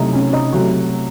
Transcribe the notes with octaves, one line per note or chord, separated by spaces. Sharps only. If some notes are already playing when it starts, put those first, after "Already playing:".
Already playing: C3 F#3 A3 D#4 E4
C#4
D#4
C3 F#3 A3 F#4